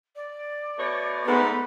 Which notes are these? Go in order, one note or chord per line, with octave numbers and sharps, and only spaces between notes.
D5
B2 A3 C#5
G#2 A3 B3 B4